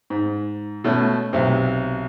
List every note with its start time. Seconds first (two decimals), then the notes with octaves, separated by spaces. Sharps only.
0.10 G#2
0.84 B2 A3 C#4
1.33 B1 C3